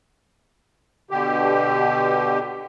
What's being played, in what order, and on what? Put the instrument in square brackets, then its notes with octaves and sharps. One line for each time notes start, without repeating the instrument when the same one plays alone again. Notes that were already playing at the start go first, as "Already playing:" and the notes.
[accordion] B2 D3 G4